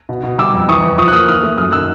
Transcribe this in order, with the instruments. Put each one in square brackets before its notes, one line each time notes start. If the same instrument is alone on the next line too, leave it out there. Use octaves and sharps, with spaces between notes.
[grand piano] B2
B2
G3 D6 E6
F2
E3 C#6 D#6
E2
F3 C#6 D#6
F#6
A#3 D#6 F6
E3 D#6 F6
A3
F#2 D#6 F6
D#3 E6 F#6